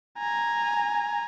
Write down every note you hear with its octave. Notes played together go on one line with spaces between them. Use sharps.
G#5 A#5